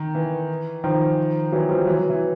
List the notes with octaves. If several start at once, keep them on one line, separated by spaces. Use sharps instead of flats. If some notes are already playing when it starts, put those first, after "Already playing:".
Already playing: D#3
E3
D#3 F3
E3 F#3
F3 G3
E3 F#3
E3
E3